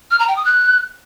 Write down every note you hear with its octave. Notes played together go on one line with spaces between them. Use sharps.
F6
A#5
G5
D#6
F#6